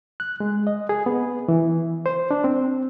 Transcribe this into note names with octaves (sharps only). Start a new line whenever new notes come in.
F#6
G#3
D#5
G#4
B3
E3
C5
D4
C4